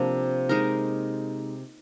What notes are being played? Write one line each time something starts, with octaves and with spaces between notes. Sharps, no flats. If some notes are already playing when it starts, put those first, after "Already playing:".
Already playing: C3 F3 A#3 D4
G#3 D#4 A#4